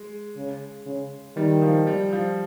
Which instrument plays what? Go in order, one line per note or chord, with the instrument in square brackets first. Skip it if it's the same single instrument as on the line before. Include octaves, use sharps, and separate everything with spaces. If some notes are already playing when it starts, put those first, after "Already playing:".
Already playing: [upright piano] G#3
[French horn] C#3
C#3
[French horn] D#3 [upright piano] G3
[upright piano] F3
G3
F3